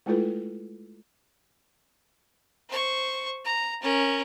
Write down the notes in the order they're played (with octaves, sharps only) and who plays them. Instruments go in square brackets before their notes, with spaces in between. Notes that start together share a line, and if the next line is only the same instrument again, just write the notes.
[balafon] G#3 A3 E4 F4 A4 B4
[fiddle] C5 C#6
A#5
C#4 A#4